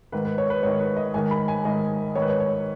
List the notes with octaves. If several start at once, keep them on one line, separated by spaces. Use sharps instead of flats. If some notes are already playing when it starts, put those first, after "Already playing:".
G#2 D#3 B4
B4
C#5
B4
G#2 D#3 C#5
B4
D#5
G#2 D#3 G#5
B5
G#5
G#2 D#3 D#5
G#2 D#3 C#5
B4
C#5
C#5